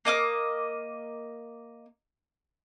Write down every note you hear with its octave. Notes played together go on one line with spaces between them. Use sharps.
A#3 D#5 D6 F6